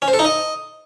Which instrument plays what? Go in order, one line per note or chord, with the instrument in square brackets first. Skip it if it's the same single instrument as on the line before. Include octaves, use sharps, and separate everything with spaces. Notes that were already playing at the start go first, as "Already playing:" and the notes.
[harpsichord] C#4
C5
A4
D#4
D#5